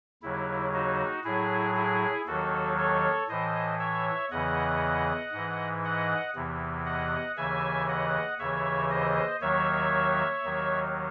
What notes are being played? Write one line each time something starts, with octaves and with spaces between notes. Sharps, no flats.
D#2 C#3 F#3 E4
D#4 F#4
A2 F#3 E4 G#4
E4 G#4
D#2 D#3 F#3 F#4 A4
A4 C#5
A2 E3 C5 D#5
C#5 E5
E2 C#3 E3 D#5 F#5
G#2 E3
D#5 F#5
E2 C3 E3
D#5 F#5
D#2 C#3 E3 E5 G#5
D#5 F#5
D#2 C#3 E3 C#5 E5
C5 D#5
D#2 D#3 F#3 C#5 E5
D#2 D#3 F#3